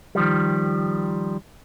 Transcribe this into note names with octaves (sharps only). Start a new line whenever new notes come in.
D#3 F3 G3